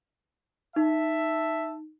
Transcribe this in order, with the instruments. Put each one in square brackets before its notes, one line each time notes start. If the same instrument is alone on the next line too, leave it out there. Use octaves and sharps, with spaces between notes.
[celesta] D#4 [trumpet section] E5 A5